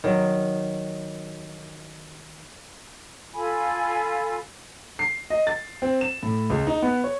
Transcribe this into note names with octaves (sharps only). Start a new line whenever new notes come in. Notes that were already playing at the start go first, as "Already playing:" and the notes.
D#3 F#3
F4 A4 G#5 B5
C7
D#5
A6
C4
E7
A2
C#2
D#4
B3
C#5